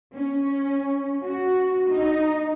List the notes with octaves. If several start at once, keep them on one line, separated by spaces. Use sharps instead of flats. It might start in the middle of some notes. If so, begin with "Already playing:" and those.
C#4
F#4
D#4